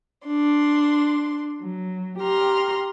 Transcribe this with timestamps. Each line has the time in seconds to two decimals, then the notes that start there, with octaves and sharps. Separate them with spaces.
0.26 D4 C6
1.62 F#3
2.19 G4 A#5 C6 F6